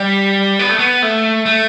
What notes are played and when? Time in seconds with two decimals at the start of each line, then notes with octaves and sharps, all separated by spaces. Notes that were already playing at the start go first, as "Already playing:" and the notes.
Already playing: G3
0.59 B3
0.69 A3
0.79 B3
1.02 A3
1.46 A3